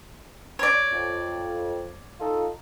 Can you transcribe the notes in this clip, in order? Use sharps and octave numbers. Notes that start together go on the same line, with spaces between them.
C#5 D5
F2
D#4 F4 A4